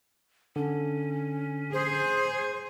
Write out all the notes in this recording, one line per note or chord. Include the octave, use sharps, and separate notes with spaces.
D3 C#4
G#4 C5